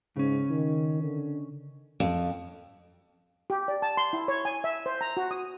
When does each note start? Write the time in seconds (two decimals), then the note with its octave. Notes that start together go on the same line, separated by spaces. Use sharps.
0.16 G#2 C#3 C#4
0.50 D#3
1.03 D3
2.00 F2
3.50 G4
3.68 D5
3.82 A5
3.97 C6
4.13 E4
4.28 C#5
4.45 G#5
4.64 E5
4.86 C5
5.01 A#5
5.17 F#4
5.31 D#6